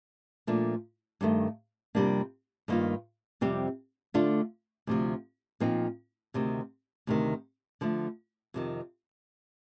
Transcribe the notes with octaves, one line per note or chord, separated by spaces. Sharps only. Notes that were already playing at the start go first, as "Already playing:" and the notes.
A#2 F3 A3 D4
G2 D#3 A3
F2 C3 G3 A#3 D4
G2 D#3 A#3 F4
F2 C3 G3 C4 G4
D3 A3 D4 F4
D2 C3 F3
A#2 F3 C4 D#4
D2 C3 D#3
D2 C3 D#3
D3 F3 A3
F2 C3 D#3